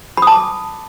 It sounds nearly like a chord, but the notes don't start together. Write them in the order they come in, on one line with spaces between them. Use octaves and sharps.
B5 D#6 A5 D6